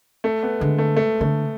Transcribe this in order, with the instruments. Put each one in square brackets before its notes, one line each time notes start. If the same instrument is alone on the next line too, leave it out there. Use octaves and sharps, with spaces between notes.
[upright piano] A3
B3
[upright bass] D3 [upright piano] G#3
[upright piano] A3
A3
[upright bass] D3 [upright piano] A3